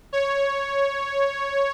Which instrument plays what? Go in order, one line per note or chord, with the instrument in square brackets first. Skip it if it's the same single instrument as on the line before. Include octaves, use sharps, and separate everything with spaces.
[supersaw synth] C#5